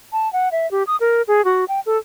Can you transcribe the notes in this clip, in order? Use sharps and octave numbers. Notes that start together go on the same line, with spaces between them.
A5
F#5
E5
G4
D#6
A#4
G#4
F#4
G5
A4